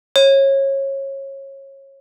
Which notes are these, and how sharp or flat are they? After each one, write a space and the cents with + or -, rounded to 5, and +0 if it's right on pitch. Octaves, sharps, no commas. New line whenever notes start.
C#5 -25